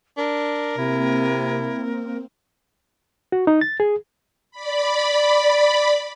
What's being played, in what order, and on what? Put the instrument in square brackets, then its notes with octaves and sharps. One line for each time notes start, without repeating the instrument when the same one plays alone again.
[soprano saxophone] D4 [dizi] A#4
[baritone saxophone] C3 [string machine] A#3 C4 [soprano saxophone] E4
[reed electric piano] F#4
D#4
A6
G#4
[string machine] D5 B5